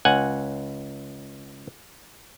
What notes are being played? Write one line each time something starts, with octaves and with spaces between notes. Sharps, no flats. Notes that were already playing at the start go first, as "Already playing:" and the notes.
C#2 F#5 G#5